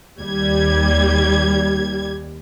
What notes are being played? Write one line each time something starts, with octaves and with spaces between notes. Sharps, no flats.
D#2 G3 G#6